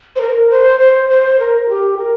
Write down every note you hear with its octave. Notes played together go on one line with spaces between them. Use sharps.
C5
A#4
C5
C5
C5
A#4
G4
A#4